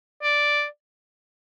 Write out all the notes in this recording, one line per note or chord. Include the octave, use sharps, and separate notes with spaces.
D5